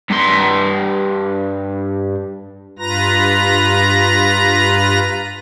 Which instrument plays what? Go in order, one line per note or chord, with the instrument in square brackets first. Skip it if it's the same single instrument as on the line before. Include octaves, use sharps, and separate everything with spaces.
[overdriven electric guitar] G2 C6
[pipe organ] G2 F4 B4 A#5 A#6